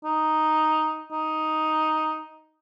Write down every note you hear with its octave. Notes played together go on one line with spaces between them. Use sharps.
D#4
D#4